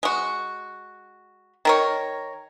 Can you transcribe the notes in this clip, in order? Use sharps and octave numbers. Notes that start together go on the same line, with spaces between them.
G#3 F#4
D#3 A#4 C#5